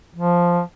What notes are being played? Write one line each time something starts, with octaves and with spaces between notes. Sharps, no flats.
F3